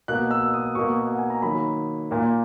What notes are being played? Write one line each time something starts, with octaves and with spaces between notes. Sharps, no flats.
B2 A#3 F#6
E6
D#6
B2 A#3 C#6
F#5
G#5
A#5
D#3 F#3 A#3 B5
A#2 A#3